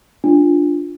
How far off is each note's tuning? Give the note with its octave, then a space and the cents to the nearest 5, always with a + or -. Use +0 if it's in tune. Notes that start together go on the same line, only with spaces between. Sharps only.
D4 +0 F4 +0